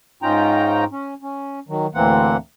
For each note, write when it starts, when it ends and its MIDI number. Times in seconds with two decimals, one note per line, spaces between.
0.22 0.84 44
0.22 0.84 61
0.22 0.84 63
0.22 0.84 65
0.22 0.84 79
0.22 0.84 82
0.92 1.14 61
1.22 1.59 61
1.69 1.87 51
1.69 1.87 54
1.94 2.37 38
1.94 2.37 45
1.94 2.37 52
1.94 2.37 58
1.94 2.37 60
1.94 2.37 78